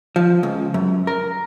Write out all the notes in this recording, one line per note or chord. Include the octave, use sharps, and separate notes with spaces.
F3
C#2
F#2
A#4